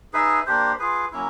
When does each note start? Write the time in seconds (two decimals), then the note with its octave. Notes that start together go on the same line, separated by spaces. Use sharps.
0.13 D#4 G#4 B4 E5
0.46 A#3 D4 G4 C5
0.79 F4 G#4 B4
1.12 F#3 A#3 C#4 E4